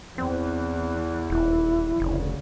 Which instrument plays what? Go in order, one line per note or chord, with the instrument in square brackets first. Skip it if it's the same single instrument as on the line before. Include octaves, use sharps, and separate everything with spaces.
[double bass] E2 E3 [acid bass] C4
[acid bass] D#1 [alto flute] E4
[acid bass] F1 [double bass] D2 C#3